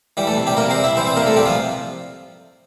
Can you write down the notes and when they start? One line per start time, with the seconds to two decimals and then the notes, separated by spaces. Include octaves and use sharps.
0.17 E3 G3 G4
0.27 A3 A4
0.37 C3
0.47 G3 G4
0.57 C3 A#3 A#4
0.70 C4 C5
0.76 G3
0.84 E4 E5
0.96 E3 C4 C5
1.07 C4 C5
1.16 C3 A#3 A#4
1.26 A3 A4
1.36 C3 G3 G4
1.46 F3 F4